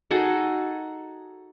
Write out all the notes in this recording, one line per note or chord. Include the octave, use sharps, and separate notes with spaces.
D#4 F#4 G#4 A4